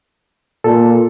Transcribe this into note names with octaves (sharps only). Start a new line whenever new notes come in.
A#2 A4